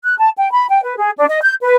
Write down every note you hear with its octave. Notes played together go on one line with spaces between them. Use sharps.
F#6
A5
G5
B5
G5
B4
G#4
D4
D#5
G6
B4